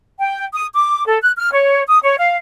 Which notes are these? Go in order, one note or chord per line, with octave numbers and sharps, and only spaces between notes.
G5
D#6
D6
A4
F#6
F6
C#5
D#6
C#5
F5